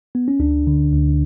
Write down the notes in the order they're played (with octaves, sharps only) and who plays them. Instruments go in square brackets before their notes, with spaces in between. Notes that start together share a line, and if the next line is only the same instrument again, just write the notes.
[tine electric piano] B3
C#4
D2 D4
D3
D2